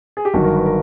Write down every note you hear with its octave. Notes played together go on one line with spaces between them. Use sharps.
G#4
G4
G1 G2 D#3 F#3 F#4
A#4
B4
A#4